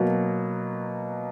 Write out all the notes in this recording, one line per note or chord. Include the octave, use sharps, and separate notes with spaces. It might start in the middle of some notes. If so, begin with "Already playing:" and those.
Already playing: B2 F#3 A#3